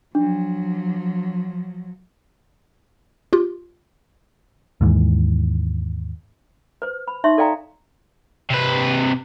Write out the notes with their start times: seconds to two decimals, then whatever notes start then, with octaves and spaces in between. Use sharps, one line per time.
0.15 F3 F#3 D4
3.33 F4 G4
4.81 D#2 G#2 E3
6.82 B4 C5
7.08 B5
7.24 D#4 C#5 E5 C6 C#6
7.38 A4 D5 F5 G5 A#5
8.50 C3 B4